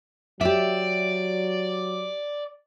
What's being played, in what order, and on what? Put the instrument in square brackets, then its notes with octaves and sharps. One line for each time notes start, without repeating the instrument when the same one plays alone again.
[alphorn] F#3 [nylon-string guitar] G4 E5 [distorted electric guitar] D5